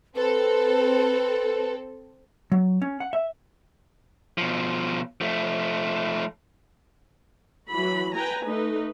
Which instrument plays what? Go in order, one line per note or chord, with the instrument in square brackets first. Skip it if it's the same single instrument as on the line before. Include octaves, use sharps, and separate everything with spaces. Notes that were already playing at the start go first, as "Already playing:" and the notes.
[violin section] C4 A4 [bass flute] B4
[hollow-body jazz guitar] F#3
C#4
F#5
E5
[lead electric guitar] B2 F3
F3 A3
[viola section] E3 F#3 F#4 B5
B4 G5 G#5 A#5
A3 D#4 B4